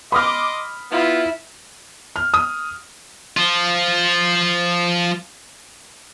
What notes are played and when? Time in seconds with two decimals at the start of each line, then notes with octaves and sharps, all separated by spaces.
0.12 D#5 B5 C6 D6 D#6 F6
0.91 B3 E4 F4
2.16 F6
2.34 D#6
3.37 F3 F4